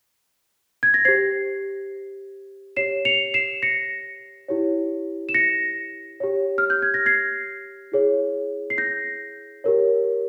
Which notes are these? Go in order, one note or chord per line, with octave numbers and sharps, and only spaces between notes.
G#6
A#6
G4 C5 G#6 C7
G4 C#5 C7 E7
C#7 F7
C7 E7
A#6 C#7
E4 G4 C#5
E7
A#6 C#7
G4 C#5
F6
G6
G#6
A#6
G#6 C7
E4 G#4 C#5
C7
G6 A#6
G4 A#4 C#5